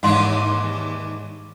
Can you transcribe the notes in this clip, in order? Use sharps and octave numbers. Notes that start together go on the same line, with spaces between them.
D#2 G#2 E3 D4 F5 F#5 C6